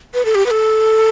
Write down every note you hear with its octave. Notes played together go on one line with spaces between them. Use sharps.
B4
A4
G4
B4
A4